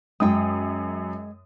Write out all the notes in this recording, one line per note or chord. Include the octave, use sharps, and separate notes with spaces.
F#2 G#3 G5 D#6